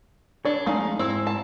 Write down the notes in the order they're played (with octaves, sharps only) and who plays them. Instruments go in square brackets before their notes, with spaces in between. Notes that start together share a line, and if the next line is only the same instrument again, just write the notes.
[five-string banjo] D4 [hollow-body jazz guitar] C#5
[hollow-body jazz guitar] F2 A3 F5 [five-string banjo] G#3 D#4
[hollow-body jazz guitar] G#2 [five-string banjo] C4 E4
[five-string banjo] A5